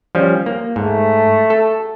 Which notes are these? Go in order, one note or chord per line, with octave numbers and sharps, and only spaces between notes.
F3 G3 C#4
A#3
G#2 A3
A4